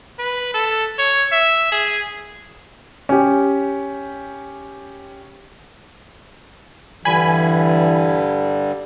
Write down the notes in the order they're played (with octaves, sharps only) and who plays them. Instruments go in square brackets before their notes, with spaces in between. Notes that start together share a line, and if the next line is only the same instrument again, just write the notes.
[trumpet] B4
A4
C#5
E5
G#4
[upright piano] C#4 G4
[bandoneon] G2 D3 G3 [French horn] E3 [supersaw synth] G#5 B5